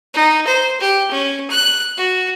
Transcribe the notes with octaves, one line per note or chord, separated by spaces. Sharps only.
D#4
C5
G4
C#4
F#6
F#4